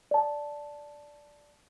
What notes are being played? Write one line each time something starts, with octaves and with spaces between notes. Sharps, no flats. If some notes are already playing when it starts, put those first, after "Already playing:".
D5 A5